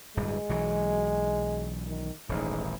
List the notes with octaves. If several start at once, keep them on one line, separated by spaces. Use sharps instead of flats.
D1 G2 G#3
B1 E3 F#3
D#3
D#1 A1 G#2